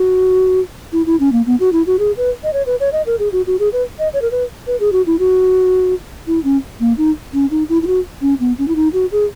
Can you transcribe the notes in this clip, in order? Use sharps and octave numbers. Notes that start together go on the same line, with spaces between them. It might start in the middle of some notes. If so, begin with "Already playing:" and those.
Already playing: F#4
E4
E4
C#4
A#3
B3
F#4
E4
F#4
G#4
B4
D#5
C#5
B4
C#5
D#5
A#4
G#4
F#4
F#4
G#4
B4
D#5
C#5
A#4
B4
B4
G#4
F#4
E4
F#4
E4
C#4
A#3
D#4
C#4
D#4
E4
E4
F#4
C#4
B3
C#4
E4
D#4
F#4
G#4